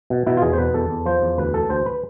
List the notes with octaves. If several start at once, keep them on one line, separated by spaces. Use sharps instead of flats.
B2
B2 E4
F4
E2 G#4
C5
B2 B4
E2 A4
E2
F3 C5
E2
D2 B4
E3 A4
D2 C5
B4